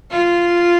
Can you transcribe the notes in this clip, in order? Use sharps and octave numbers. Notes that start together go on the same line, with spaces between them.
F4